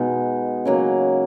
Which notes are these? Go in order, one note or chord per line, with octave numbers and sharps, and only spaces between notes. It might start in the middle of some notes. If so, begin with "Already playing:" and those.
Already playing: B2 G#3 B3 D#4
C#3 F#3 A#3